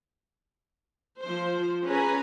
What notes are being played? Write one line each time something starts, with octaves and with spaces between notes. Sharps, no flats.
F3 C5
C#4 G#4 B4 G#5 A#5